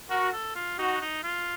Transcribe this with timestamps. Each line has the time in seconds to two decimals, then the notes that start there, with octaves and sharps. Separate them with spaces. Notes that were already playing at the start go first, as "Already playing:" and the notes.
0.10 F#4 A#4
0.33 A4
0.55 F4
0.78 D#4 F#4
1.01 D#4
1.23 F4